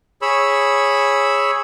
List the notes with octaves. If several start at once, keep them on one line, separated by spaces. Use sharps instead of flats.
G#4 C#5 B5 E6